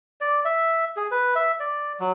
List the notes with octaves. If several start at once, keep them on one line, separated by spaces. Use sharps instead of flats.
D5
E5
G#4
B4
E5
D5
F#3